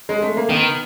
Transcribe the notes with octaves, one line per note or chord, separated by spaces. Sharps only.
G#3
A3
A#3
D#3 B3